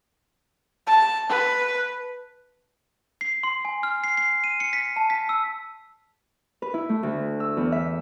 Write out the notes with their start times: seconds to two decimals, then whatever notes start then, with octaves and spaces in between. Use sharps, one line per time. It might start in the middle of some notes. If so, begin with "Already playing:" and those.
0.87 A5
1.30 B4
3.21 C7
3.43 C6
3.65 G#5
3.83 F6
4.04 C7
4.17 C7
4.44 D#7
4.60 C#7
4.73 B6
4.96 A5
5.10 B6
5.29 E6
6.62 B4
6.74 E4
6.89 A3
7.03 D2
7.40 E6
7.57 E2
7.72 E5